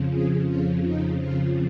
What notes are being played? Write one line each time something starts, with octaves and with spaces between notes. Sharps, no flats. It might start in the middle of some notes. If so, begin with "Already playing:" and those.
Already playing: F2 C#3 F3
G#4
F2 C#3 F3 F4
D#4
F2 C#3 F3 F4